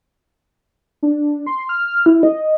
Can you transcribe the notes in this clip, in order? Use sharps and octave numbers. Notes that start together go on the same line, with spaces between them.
D4
C6
F6
E4
D#5